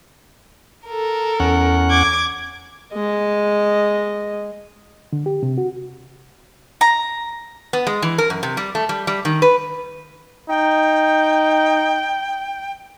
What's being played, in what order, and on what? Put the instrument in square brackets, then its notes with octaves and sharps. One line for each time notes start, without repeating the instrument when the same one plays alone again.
[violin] A4 A#4
[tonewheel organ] E2 C#4 F#5
[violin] D6 G#6
[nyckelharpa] G#3 D#5
[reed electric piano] D3
G4
C3
F#4
[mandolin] A#5
[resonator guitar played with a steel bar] B3
G#3
E3
A#4
F#2
C3
G3
A3
G3
G3
D#3
B4
[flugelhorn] D#4 [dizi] G5